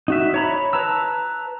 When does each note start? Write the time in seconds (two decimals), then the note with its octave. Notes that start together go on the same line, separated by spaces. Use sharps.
0.08 D#4 F#4 E5
0.34 C#5 A#5 B5
0.73 B4 A5 A#5 E6